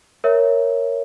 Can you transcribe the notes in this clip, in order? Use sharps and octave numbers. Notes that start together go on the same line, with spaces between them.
A#4 C#5 E5